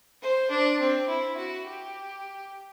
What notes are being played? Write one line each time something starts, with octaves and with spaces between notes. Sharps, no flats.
C5
D4
C4
E4
F#4
G4